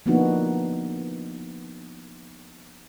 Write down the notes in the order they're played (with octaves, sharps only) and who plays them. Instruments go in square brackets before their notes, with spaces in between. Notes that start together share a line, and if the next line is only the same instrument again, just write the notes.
[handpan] F3 A#3 B3 D4 D#4 F#4